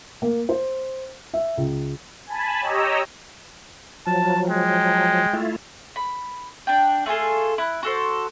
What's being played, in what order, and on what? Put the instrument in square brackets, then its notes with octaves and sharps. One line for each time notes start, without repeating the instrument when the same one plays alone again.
[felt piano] A#3
C5
E5
C#2
[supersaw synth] G#5 A5 B5
G4 C#5 D#5 A#5 E6
[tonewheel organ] F3 F#3 [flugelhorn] A5
[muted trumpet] G#3 [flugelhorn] G5
[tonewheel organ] A3 E4 F4
[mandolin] B5
D4 G5
A3 F4 G#4 A4
E4 B5 F#6
F#4 A4 C5